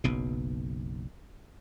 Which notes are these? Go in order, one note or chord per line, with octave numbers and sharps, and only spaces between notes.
F#1 B1 B2